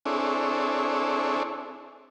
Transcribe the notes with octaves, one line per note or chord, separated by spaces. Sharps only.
C4 D4 E4 G#4 A4 C#5